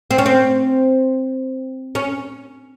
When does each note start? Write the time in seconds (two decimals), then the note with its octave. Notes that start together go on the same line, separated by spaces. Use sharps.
0.11 C4
0.18 C#4
0.26 C4
1.95 C#4